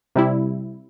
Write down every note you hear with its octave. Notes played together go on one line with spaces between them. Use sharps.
C3 G3 E4